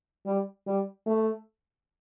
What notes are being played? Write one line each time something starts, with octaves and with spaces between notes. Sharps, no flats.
G3
G3
A3